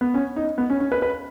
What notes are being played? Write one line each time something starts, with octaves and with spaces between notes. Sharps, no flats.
B3
C#4
D#4
B3
C#4
C#4
B4
B4